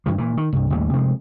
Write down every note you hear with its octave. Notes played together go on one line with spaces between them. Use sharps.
G2 E3 F3
A#2 E3
D#3
C2 G2
A1 D#2 G3
C3 F3 G3 G#3